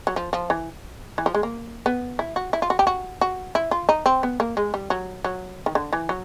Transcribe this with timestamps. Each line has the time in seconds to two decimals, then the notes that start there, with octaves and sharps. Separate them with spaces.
0.07 F#3
0.16 F3
0.33 F3
0.50 E3
1.18 E3
1.26 F3
1.35 G#3
1.43 A#3
1.86 B3
2.19 E4
2.36 F#4
2.53 E4
2.62 F4
2.70 F#4
2.79 G4
2.87 F#4
3.21 F#4
3.55 E4
3.71 F4
3.89 D#4
4.06 C4
4.23 B3
4.40 A#3
4.57 G#3
4.74 G3
4.90 F#3
5.25 F#3
5.66 D#3
5.75 D3
5.93 E3
6.09 F#3